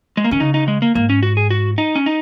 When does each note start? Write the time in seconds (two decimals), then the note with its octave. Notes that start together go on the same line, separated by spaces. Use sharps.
0.17 G#3
0.24 A#3
0.31 D#3 C#4
0.40 C#3 D#4
0.54 D#4
0.68 G#3
0.82 A#3
0.95 G#2 A#3
1.10 C#4
1.23 F#4
1.37 G#4
1.51 F#4
1.78 D#4
1.95 C#4
2.06 D#4